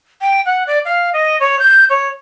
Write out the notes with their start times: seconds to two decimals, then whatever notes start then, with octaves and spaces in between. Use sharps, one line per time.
0.21 G5
0.46 F#5
0.67 D5
0.85 F5
1.13 D#5
1.40 C#5
1.59 G6
1.90 C#5